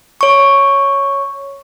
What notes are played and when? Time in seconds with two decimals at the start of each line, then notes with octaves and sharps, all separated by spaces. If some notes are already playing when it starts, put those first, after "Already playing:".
0.21 C#5 C#6